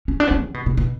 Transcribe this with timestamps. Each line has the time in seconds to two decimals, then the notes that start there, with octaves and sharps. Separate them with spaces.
0.08 C#4
0.20 D4
0.27 B3
0.31 C#4
0.43 D3
0.54 B2
0.66 B2
0.77 B2